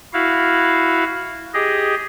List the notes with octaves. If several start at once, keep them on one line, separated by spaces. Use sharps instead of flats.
E4 F#4 F5
G4 G#4 D#5